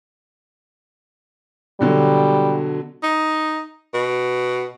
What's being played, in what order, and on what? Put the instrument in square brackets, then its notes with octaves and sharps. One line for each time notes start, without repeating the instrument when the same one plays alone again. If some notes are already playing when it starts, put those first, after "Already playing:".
[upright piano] B2 D3 F#3 [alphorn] G3
[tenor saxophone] D#4
B2